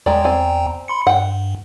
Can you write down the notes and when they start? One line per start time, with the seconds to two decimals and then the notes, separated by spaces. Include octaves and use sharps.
0.06 E2 G#3 D5 G5 A#5
0.24 C4 D5 G#5
0.88 B5 C6 C#7
1.07 G2 F#5 G5